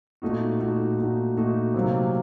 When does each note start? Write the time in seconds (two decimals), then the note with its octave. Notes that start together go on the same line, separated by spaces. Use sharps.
0.22 A#2 A3 D#4 F#4
0.60 A#2 A3 D#4 F#4
0.98 A#2 A3 D#4 F#4
1.36 A#2 A3 D#4 F#4
1.74 C3 F#3 A#3